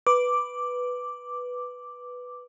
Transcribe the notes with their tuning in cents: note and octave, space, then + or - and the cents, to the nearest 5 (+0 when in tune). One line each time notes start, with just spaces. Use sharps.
B4 +0 D6 +0